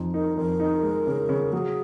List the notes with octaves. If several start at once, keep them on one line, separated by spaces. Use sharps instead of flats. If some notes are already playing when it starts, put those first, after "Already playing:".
Already playing: F2 D#4
D#4 A#4
F2 A#4
D#4
G#3
C#3
C#3
F#3 G#4